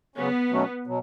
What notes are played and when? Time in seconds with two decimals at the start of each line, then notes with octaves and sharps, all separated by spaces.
0.16 C#3 F#3 B3 C#4
0.51 B2 F#3 A3 C#4 F#4
0.87 B2 F#3